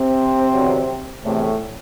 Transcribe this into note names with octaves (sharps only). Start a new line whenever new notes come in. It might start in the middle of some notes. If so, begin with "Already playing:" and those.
Already playing: C3 C4
E2 D3 F#3
E2 A2 C3 E3 A3